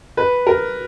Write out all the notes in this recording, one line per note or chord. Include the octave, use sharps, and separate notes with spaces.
B4
A#4